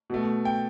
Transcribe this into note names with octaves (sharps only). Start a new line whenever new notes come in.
B2 A3
G5